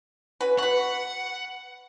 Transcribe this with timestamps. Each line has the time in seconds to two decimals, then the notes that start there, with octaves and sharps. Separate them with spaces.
0.40 C#4 F#4 B4
0.58 F#4 B4 F#5